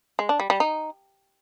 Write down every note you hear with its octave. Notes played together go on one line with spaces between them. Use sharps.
G#3
D4
G3
G3
D#4